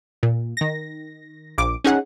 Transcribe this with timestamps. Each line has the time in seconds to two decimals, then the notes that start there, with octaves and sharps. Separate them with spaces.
0.23 A#2
0.57 D#3 A#6
1.58 A#1 D6
1.84 C#4 D#4 G#4 F#5